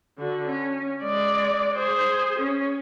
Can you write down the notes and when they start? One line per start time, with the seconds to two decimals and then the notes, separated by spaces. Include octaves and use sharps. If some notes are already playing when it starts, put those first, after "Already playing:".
0.18 D3 F#4
0.47 C#4
1.02 G#3 D5
1.75 G#4 C5
2.38 C#4